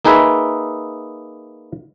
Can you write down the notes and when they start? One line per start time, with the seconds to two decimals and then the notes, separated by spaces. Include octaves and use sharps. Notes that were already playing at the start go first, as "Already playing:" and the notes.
0.05 A#3 D#4 G#4 B4 E5